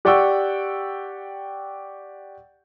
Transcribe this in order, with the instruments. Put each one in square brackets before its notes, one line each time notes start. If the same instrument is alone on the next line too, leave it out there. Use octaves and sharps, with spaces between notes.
[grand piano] G4 D5 F#5 G5 C#6 E6